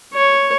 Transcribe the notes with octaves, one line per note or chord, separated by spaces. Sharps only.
C#5